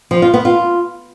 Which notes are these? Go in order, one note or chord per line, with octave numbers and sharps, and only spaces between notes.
F3
F4
B3
F4